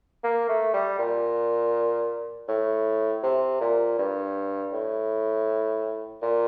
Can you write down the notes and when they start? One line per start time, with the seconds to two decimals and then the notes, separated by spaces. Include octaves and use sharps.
0.24 A#3
0.49 A3
0.74 G3
0.98 A#2
2.48 A2
3.23 C3
3.60 A#2
3.98 G2
4.73 A2
6.23 A#2